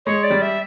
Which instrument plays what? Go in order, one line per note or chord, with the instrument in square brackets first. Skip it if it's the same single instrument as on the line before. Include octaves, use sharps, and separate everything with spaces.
[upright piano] G#3 [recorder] C#5
[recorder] D5
[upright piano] G3
[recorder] E5